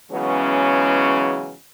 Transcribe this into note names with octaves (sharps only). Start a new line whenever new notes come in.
C#3 E3 F#3 G#3 B3 C#4